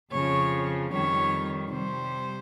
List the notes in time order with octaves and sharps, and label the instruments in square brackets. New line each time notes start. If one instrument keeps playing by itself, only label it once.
[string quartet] F2 C#3 F3 C#5
F2 D#3 G3 C#5
C3 G3 C5